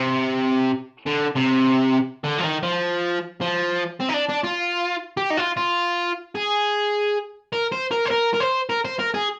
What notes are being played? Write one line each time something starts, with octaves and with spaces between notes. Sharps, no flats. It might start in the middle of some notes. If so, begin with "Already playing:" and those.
Already playing: C3
D3
C3
D3
F3
D#3
F3
F3
C4
D#4
D4
D4
F4
G4
D#4
F4
F4
G#4
A#4
C5
A#4
C5
A#4
A#4
C5
A#4
C5
A#4
G#4